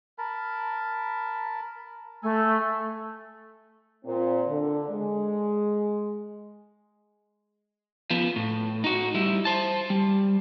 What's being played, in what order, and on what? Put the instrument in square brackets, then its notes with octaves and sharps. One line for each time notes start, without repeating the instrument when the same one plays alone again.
[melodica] A#4 A5 B5
[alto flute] A3 [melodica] A4 G#5
[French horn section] A#2 C4
D3
G#3
[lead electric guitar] F3 B3
A2
D#4 F#4
G3 E4
C5 A5
G3